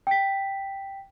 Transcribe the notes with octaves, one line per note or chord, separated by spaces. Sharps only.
G5 B6